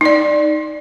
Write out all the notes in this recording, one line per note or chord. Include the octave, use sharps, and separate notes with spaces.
D#4 D5